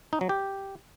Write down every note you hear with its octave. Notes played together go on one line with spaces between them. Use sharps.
D#4
F#3
G4